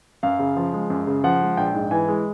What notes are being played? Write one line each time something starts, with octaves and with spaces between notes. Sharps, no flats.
F#2 F5
C#3
F3
G#3
F#2
C#3
F3 F#5
G#3
A#1 G5
G#2
E3 G#5
G#3